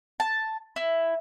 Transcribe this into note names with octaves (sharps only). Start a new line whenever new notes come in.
A5
E4